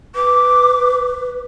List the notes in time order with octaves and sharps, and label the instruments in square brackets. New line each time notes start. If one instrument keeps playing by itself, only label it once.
[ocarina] B4 [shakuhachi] D6